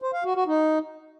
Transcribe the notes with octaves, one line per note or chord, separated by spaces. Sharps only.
C5
F5
F#4
F#4
D#4